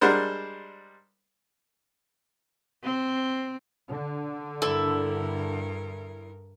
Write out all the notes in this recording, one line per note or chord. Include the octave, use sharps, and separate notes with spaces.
G3 G#3 D4 A#4 C5 F#5
C4
D3
G2 E4 A4 A#4